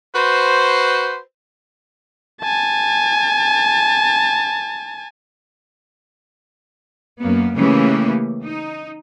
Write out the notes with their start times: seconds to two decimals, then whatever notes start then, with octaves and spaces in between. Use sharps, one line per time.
0.15 F#4 B4 C5
2.42 G#5 A5
7.20 F#2 A#3 B3
7.54 C#3 E3 A3 A#3 C#4 G4
8.42 D#4